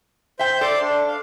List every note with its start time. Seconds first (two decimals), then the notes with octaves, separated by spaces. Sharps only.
0.39 C5 E5 G5 G6
0.61 A4 D5 C6 D6
0.81 D4
1.08 F5